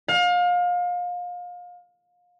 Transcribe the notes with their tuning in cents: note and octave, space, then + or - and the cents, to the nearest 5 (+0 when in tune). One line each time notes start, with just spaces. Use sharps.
F5 +30